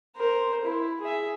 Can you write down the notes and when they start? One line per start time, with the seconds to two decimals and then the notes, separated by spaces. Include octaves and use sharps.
0.17 A#4 C5
0.65 E4
1.01 G#4 E5